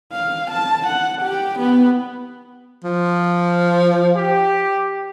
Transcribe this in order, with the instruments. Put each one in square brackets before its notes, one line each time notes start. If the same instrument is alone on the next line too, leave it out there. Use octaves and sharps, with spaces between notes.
[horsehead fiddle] F5
A5
F#5
G4
B3
[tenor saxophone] F3
[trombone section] G4